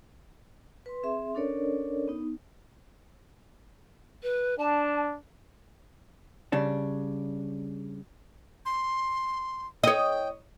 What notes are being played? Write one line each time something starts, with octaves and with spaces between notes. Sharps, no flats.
B4 C6
C4 G#4 E5 C6
C#4 D4 A4 A#4 C#5 D5
B3 D#4
B4
D4 A5
C#3 G3 D4
C6
C#5 D#5 G5